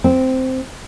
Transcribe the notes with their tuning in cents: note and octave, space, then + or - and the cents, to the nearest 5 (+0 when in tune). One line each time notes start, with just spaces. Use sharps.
C4 -10